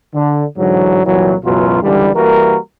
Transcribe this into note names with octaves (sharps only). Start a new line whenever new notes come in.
D3
G#2 D3 E3 F#3
C2 A#2 E3 F#3
C#2 F#2 B2 E3 F#3 F4
C#2 D3 E3 G3
E3 G3 A#3 F#4 A#4